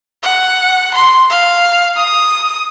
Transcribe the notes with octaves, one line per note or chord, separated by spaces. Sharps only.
F#5
C6
F5
D#6